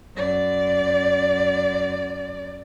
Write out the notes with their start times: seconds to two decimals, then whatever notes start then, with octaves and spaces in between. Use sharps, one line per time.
0.16 F#2 D5